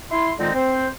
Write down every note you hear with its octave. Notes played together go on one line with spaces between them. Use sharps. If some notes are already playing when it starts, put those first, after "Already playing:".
E4 C6
D3 D#3 G#3 C4 D#4 F4
C4 C5